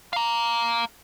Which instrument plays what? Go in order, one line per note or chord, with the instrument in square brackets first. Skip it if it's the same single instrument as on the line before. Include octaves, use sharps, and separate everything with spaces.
[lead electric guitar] F5 A#5